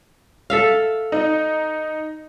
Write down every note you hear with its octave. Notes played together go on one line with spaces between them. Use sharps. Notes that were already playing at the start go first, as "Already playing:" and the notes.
A4 E5 F5
D#4